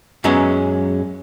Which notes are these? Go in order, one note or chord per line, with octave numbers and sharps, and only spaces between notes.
F#2 F#3 G#3 B3 C#4